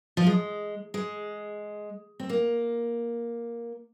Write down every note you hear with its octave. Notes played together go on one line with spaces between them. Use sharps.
F3
G#3
G#3
C4
A#3